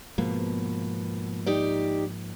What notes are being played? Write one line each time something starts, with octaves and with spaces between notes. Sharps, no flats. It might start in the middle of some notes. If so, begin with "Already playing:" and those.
G#2 B2 F3 A#3
D#4 G4 D5